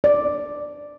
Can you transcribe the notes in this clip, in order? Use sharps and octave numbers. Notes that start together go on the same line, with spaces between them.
D5